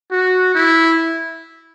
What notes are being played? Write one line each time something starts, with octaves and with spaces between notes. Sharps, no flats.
F#4
E4